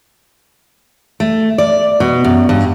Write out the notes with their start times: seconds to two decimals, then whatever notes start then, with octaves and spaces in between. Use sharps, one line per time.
1.20 A3
1.58 D5
2.00 B2
2.24 F#2
2.49 G2